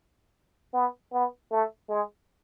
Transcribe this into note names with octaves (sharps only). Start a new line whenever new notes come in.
B3
B3
A3
G#3